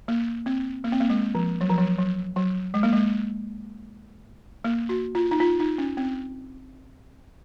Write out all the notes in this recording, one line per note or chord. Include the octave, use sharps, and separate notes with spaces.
A#3
C4
A#3
C4
A#3
G#3
F3
F#3
F3
F#3
F#3
F#3
G#3
A#3
G#3
A#3
F#4
F4
D#4
F4
D#4
C#4
C4